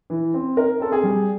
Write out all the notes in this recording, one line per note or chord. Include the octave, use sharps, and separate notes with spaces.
E3
C4
D#4 A#4
C4 A4
G#4
G3